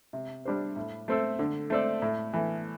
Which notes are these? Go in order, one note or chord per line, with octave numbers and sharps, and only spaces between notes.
C3
G3 D4 G4 C5
A2
A3 C4 A4
D3
A3 C4 A4 D5
A2
E3 A3